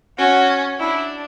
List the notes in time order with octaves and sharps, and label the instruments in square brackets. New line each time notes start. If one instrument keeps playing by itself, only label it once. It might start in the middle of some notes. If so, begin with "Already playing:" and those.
[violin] C#4 [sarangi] F#4
[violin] D4 [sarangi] E4